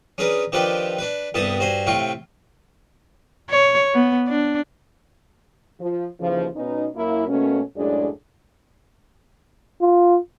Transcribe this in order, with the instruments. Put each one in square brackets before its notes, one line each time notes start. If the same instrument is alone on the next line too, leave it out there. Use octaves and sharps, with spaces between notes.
[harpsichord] C#4 D4 G#4 A#4 B4
D#3 F3 D4 G4 A4 B4
D4 B4
C2 G2 B3 A4 A5 D#6
G2 F#4 C5 G#5
A2 C3 F4 G5 C#6
[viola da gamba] C#5
B3
D4
[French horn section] F3 F4
D#2 C#3 E3 F3
B2 B3 C#4 D#4
F#2 A#3 E4
B2 A3 A#3 C#4
F#2 A2 G#3 D4 G#4 D5
[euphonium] F4